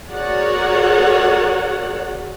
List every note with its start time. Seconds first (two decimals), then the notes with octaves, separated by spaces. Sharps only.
0.11 F#4 G#4 A#4 C#5 D5 F#5